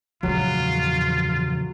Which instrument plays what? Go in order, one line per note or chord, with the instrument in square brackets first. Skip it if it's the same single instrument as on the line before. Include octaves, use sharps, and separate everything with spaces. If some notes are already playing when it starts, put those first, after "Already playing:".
[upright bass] E2 [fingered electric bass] A#2 C#3 F3 [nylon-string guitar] F#3 [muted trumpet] F4